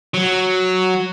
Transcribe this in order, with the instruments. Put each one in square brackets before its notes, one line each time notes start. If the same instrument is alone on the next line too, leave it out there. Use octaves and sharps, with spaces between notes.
[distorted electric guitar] F#3